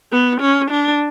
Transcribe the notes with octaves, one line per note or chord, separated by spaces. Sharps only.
B3
C#4
D4